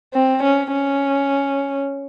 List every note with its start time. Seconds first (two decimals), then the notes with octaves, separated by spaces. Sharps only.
0.14 C4
0.43 C#4
0.73 C#4